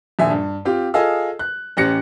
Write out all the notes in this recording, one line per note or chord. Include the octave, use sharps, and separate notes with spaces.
D#1 A#1 E5 G#5
G2
C4 F4 G4
F4 G#4 A4 D#5 F5 E6
F#6
A1 C#4 G4 F#6 A#6 C#7